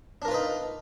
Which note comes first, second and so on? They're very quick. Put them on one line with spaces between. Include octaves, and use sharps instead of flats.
D4 A#4 F4 B4 D#4